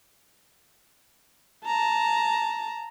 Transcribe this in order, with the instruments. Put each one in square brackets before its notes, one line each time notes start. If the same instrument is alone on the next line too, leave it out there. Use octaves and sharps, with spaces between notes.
[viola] A5 A#5